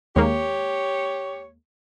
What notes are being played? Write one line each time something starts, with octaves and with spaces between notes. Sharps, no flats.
D#2 G#3 A#3 G4 C#5